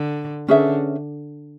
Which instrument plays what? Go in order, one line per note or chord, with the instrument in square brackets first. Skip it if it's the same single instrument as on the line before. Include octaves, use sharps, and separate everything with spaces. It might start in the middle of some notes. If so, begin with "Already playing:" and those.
Already playing: [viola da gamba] D3
[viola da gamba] D3 [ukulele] C#4 G#4 B4 E5